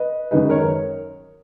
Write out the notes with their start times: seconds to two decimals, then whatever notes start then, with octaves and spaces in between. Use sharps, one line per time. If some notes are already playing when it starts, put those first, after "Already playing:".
Already playing: B4 D#5
0.31 F#2 D#3 G#3 D#4 B4 D#5
0.49 A#4 C#5